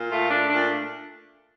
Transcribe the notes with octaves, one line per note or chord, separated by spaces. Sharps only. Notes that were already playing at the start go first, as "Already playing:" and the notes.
Already playing: A#2
A3 F4
A3 D4
A#2 D4